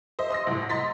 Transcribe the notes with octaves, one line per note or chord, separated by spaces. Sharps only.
C5 D#5 E5
C6 D#6 E6 A#6
C2 A2
D#5 A#5 C6 A6 B6